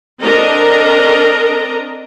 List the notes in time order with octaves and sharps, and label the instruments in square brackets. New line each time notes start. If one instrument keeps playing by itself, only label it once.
[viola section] C4 D4 A4 A#4 D#5 A#5